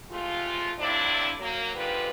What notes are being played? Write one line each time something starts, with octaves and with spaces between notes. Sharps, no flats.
C3 G#3 A3 F4
A2 C3 F3 D4 E4 D5
F#3 A#3
F2 G#2 D3 G3 F4 B4